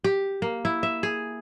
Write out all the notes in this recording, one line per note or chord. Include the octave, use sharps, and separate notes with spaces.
G4
A#3
E4
E5
G#4